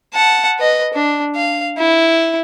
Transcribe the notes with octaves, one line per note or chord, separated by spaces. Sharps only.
F#5 A5
B4 D#5
D4
F5
E4